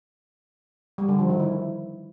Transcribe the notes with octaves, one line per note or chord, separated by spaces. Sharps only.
G3
D3
F3
D#3
E4